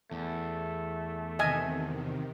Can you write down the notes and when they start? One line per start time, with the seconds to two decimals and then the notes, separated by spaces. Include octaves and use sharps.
0.11 E2 A3
1.39 C3 D#3 D#5 E5 G#5